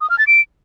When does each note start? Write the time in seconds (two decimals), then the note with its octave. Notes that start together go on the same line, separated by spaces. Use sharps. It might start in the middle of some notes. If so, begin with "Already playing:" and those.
0.01 D#6
0.10 F6
0.19 A6
0.27 D7